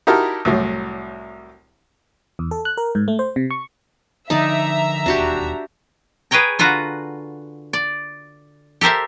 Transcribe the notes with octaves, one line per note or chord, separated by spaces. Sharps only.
D#4 E4 F#4 G4 A#4 A5
C2 A2 F#3
E2
A4
F#6
A#4
G#2
A3
C5
C3
C#6
D3 F3 D#4 D5 E5 A#5
E1 D#2 D4 F#4 G4
G#4 B4 C#5 G5 A#5
D3 F4 F#4 B4 A#5
D5
G4 A4 A#4 C5 E5